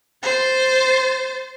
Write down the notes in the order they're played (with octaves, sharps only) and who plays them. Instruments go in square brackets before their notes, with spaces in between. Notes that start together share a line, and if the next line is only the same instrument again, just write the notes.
[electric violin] C5 A6